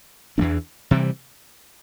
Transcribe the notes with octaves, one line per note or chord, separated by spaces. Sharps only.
E2 E3 A3 D4
C3 E3 G3